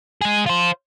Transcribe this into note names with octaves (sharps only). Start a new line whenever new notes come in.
G#3 G#4
F4 C5